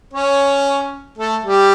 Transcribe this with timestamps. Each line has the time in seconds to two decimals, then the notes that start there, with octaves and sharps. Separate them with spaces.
0.13 C#4 C#5
1.18 A3 A4
1.44 G3 G4